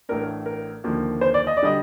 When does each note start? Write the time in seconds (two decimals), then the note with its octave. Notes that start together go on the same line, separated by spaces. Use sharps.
0.09 A1 A2 A3 D4 A#4
0.46 A#4
0.84 D#2 D3 F3 A#3
1.21 C5
1.34 D5
1.47 D#5
1.57 D5
1.62 D3 G3 D#5